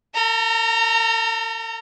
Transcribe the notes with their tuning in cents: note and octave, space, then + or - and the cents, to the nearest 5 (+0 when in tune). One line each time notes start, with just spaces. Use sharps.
A4 +45 A#5 -15